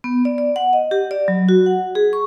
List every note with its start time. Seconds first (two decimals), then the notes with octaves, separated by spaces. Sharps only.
0.04 B3
0.25 D5
0.38 D5
0.56 F#5
0.73 D#5
0.91 G4
1.11 D5
1.28 F#3
1.49 F#4
1.66 F#5
1.95 G#4
2.13 C#6